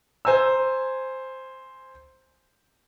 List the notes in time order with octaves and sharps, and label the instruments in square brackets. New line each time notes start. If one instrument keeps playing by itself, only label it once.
[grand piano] C5 G#5 A#5 E6